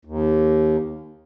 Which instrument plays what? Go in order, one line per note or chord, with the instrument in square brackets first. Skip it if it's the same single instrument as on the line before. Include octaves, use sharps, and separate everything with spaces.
[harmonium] D#2